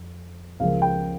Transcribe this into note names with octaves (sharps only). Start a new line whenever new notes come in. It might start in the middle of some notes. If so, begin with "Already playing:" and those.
Already playing: F2
C#2 C#3 F3 A#3 F5
G5